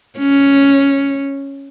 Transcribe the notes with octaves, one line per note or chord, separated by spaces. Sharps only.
C#4